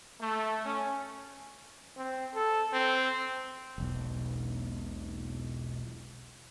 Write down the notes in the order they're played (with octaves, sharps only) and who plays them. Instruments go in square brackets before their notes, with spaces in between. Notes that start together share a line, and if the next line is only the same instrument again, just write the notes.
[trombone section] A3
C#4
[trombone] C4
A4
C4
[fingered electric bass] E1 B1